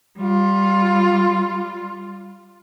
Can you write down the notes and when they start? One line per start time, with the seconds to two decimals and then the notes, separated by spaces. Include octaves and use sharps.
0.18 G3 F4